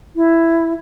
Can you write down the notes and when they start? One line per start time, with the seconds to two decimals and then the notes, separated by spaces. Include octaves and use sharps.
0.16 E4